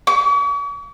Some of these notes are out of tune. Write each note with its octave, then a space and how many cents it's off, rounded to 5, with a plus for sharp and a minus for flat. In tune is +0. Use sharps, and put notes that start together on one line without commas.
C#6 +45